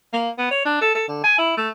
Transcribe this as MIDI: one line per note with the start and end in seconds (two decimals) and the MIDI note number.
0.13 0.30 58
0.38 0.50 59
0.51 0.61 73
0.65 0.76 62
0.81 0.93 69
0.95 1.03 69
1.08 1.22 50
1.23 1.37 80
1.38 1.55 64
1.57 1.69 57